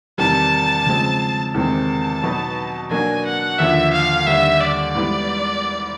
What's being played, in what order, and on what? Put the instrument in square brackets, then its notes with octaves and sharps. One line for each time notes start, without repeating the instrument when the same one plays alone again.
[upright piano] E2 C3 D#3 G3 [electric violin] A5
[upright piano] C#3 F3 G#3 C4
[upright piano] E2 C3 D#3 G#3 C4 [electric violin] A5
[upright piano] B2 F#3 B3 D#4
[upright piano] B2 F#3 A#3 D4 F#4 [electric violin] G#5
[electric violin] F#5
[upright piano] D#2 D3 F3 [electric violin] E5
[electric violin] F5
[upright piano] D#2 D3 G3 [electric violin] E5
[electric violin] D5
[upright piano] G#2 E3 G3 B3